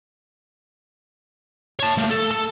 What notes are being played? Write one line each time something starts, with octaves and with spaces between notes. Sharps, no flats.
C#5 A5
A3 A#3
A4
A4